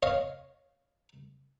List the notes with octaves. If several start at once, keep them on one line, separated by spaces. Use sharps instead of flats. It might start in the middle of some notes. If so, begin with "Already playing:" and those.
C#5 D#5 F5